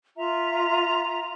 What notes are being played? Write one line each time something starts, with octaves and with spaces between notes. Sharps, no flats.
F4 E5 A#5